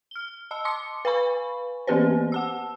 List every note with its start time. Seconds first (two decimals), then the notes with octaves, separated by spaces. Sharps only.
0.11 F6 G7
0.51 D#5 A5 E6
0.65 A5 C6 D6 D#6 C#7
1.05 B4 F5 G#5 B5 C#6
1.87 E3 A#3 B3 G4 B4 C5
2.32 F#5 A5 E6